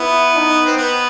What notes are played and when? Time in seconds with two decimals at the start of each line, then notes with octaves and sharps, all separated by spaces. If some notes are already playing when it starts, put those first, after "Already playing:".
Already playing: B3 E4
0.35 D#4
0.66 C4
0.77 B3